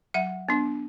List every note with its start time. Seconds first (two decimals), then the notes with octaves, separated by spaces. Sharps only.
0.14 F#3 E5 F#5
0.49 B3 D4